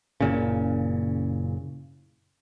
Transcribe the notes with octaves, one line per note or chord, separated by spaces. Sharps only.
F#1 A#2 C#3